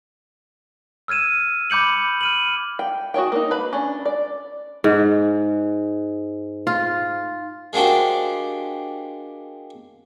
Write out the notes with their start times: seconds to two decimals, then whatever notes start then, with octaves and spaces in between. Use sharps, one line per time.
1.08 E6 F6 G#6 D#7 E7
1.70 B5 D6 G6 C#7 F#7
2.21 F6 D#7 F#7
2.79 G5
3.14 F#4 G#4 C#5 G5
3.32 A#3 D#4
3.51 B4 B5
3.73 C#4 D4
4.05 D5
4.84 G#2
6.67 F4
7.73 G#3 A#3 D4 F#4 G4 C5